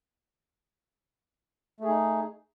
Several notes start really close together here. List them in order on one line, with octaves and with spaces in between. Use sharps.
A3 G#4 D#4